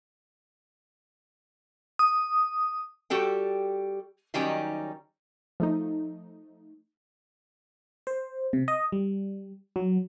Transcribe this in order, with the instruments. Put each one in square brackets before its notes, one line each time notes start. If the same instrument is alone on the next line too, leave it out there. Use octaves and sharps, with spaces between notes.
[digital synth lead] D#6
[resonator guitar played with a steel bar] G3 F#4 G4 A4 G5
D#3 F#3 G3 C#4 D#4 G4
[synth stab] F3 A3 D#4
[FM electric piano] C5
C3
D#5
G3
F#3